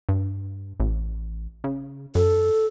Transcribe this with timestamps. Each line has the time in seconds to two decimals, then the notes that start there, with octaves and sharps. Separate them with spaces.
0.09 G2
0.80 A1
1.64 C#3
2.15 F#2 A4